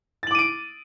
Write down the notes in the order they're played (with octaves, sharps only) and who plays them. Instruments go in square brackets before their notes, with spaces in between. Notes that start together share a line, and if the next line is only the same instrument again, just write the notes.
[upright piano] A6
F#7
D6
D#7
D7